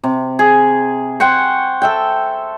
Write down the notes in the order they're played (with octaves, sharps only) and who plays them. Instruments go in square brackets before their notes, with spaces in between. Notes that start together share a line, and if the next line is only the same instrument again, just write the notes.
[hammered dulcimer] C3
G#4
C5 F#5 G5 C#6
A4 E5 G5